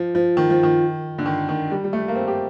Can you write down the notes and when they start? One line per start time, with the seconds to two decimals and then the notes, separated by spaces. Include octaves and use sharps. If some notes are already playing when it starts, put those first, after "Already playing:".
Already playing: F3
0.15 F3
0.37 D#3
0.50 F3
0.63 D#3
1.18 D3
1.26 D#3
1.49 D#3
1.71 G3
1.84 G3
1.93 A3
2.08 A#3
2.15 C4
2.28 G4